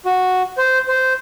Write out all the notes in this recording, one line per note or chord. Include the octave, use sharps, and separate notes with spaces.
F#4
C5
C5